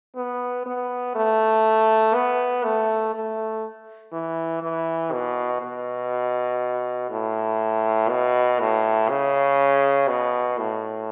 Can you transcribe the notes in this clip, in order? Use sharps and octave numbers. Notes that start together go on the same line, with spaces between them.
B3
B3
A3
B3
A3
A3
E3
E3
B2
B2
A2
B2
A2
C#3
B2
A2